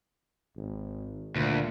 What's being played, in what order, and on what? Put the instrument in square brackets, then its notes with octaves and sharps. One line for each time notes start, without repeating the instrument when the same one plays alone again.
[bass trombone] G#1
[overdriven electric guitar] D2 [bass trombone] A#2